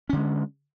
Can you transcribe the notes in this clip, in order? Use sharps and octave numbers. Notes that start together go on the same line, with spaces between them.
D3 G#3 C#4